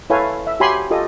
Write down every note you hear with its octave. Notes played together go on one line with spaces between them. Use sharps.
E4 A4 B4 C#5 F5 G#5
E5
F#4 G4 C#5 G#5 B5 C6
F4 G4 A4 D#5 D#6